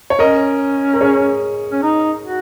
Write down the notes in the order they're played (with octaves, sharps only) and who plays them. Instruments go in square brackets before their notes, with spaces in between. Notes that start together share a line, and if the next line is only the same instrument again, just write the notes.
[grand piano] C#5
[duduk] C#4 [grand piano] A#4 D#5
[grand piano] A#4
G#4 C#5
[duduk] C#4
D#4
F#4